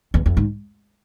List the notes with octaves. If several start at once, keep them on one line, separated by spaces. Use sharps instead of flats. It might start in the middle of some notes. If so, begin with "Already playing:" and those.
E2
F2
G#2